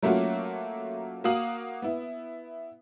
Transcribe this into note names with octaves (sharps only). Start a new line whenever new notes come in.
F#3 A3 A#3 C#4 F4 F#4
A#3 F#4 F5 D#6 F#7
B3 E4